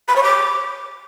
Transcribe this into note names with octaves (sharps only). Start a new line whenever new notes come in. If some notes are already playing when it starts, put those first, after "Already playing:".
B5
C#5
D6